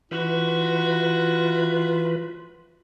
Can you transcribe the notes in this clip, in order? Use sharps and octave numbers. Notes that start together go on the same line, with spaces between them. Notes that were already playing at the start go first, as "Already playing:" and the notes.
E3 F4 F#4 B4